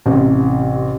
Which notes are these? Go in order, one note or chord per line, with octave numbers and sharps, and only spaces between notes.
A1 C3